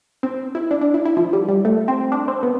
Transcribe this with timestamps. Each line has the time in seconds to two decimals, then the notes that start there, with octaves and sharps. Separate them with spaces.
0.23 C4
0.55 E4
0.71 D4
0.81 D4
0.94 E4
1.05 E4
1.17 F3
1.33 G3
1.48 G3
1.65 A3
1.88 C4
2.12 D4
2.28 C4
2.43 B3